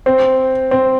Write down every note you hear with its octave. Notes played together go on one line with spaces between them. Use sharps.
C4
C4